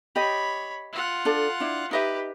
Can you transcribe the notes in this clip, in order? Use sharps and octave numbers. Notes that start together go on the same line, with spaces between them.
G4 C#5 D#5 B5
F4 F#5
D4 A4
D4 E4
D#4 G4 B4 D#5 E5